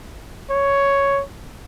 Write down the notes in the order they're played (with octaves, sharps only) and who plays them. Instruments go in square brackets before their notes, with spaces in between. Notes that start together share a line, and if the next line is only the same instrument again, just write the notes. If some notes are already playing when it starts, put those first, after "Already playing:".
[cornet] C#5